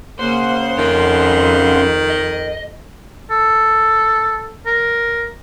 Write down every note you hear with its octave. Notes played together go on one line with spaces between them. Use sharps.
C#3 A#3 C5 F#5 C6
F2 D#3 C#4 A#4
D#5
A4
A#4